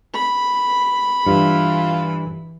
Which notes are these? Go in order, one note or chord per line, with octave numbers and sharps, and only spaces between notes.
B5
G2 E3 F4